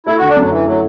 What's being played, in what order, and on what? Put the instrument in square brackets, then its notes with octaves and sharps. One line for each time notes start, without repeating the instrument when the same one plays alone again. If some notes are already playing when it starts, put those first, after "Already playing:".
[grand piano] A3 [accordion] E4
[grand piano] D3 [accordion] F#4
[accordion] D4
[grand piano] F#2 [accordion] F#3
[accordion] E3 [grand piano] E4
[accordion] F#3 [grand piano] A3